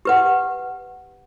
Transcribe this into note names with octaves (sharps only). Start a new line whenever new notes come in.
G4 B4 F#5